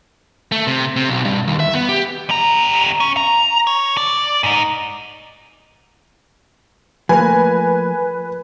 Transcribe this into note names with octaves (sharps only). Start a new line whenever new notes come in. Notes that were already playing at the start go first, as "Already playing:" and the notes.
A3
C3
C3
B1
G2
D#2
E5
B3
G4
G3 A#5
C#4
A#5
C#5
D5
G#2 D#4
F3 A3 A#3 B4 G#5